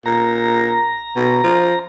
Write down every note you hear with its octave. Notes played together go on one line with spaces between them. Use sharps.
A#2 A#5
B2
F3